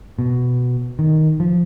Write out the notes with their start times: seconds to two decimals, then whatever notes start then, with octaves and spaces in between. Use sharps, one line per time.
0.19 B2
0.99 D#3
1.40 F3